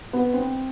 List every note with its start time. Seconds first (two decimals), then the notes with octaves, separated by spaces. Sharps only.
0.13 B3
0.34 C4